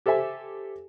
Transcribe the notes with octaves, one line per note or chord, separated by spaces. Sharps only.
G4 A4 C5 E5 G#5